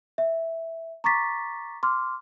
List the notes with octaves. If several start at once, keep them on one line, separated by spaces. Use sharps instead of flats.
E5
A#5 C#6 D6 A6 B6
C6 D6 F6